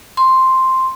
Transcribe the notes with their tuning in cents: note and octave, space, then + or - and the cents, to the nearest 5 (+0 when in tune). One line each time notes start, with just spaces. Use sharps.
C6 +0